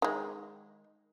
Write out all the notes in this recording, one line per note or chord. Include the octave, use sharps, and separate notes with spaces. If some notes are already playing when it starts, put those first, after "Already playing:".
D#3 G#3